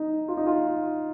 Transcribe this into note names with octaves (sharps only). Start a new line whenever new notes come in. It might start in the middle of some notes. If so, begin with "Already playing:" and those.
Already playing: D#4
F4
D#4
F4